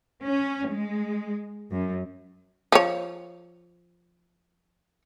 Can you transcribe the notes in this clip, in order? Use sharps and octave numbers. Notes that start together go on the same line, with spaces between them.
C#4
G#3
F#2
F3 C#5